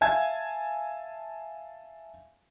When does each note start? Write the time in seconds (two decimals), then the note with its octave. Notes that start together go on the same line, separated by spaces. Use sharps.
0.01 E5 F5 G#5 A5 E6 G#6